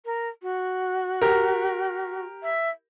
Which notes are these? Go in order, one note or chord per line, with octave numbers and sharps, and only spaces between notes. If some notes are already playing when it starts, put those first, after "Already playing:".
A#4
F#4
G4 A#4
E5